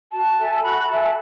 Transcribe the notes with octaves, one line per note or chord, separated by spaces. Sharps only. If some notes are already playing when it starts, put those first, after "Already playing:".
F#4 A5
A4 E5 G#5
F#4 B5
A4 E5 G#5 A5